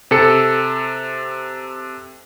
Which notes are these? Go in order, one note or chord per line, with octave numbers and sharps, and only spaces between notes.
C3 A4 C#7